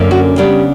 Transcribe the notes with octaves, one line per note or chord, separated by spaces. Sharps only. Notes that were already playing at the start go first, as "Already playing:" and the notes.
Already playing: F#2 D3 A#3 C#4
F#4
C#3 G3 B3 D4